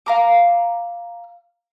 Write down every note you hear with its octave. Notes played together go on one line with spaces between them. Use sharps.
F5 A#5 D6